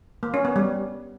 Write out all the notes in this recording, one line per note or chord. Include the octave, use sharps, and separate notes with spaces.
A#3
C#4
B3
G3